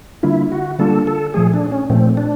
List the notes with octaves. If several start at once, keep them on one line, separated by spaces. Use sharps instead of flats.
D3 G3 A#3 D4 E4 F4
F#4
D3 G3 A#3 D4 F4 A4
A4
A#2 F3 A3 G#4
D4
C#4
A#2 F3 A3 C4
D4